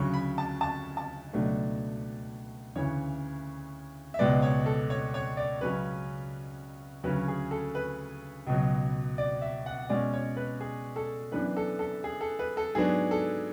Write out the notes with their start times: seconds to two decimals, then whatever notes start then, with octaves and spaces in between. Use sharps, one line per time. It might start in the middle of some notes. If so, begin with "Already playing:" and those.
Already playing: D2 C#3 F#3 C#6
0.14 B5
0.38 A5
0.61 A5
0.97 A5
1.33 C#2 B2 F#3 A3 D4
2.75 D2 C#3 E3 C#5
4.14 E5
4.19 C#2 B2 G#3 B3 D5
4.42 C#5
4.66 A4
4.90 C#5
5.14 C#5
5.37 D5
5.61 C#2 C#3 F#3 C#4 B4
7.04 D2 C#3 F#3 C#4 B4
7.28 G#4
7.51 A4
7.75 B4
8.47 C#2 B2 F#3
9.18 D5
9.42 E5
9.66 F#5
9.89 B2 G#3 C#4 D5
10.13 C#5
10.37 B4
10.61 G#4
10.96 A4
11.32 F#2 E3 B3 D4 B4
11.57 A4
11.79 A4
12.04 G#4
12.21 A4
12.39 B4
12.57 A4
12.75 G#2 F#3 B3 D4 G#4
13.11 A4